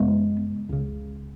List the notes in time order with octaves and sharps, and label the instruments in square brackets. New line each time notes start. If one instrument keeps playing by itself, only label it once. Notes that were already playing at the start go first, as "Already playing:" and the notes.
Already playing: [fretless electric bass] F#2 C#3 G#3 B3
C#2 C#3